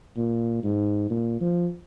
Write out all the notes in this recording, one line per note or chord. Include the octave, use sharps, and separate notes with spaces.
A#2
G#2
A#2
F3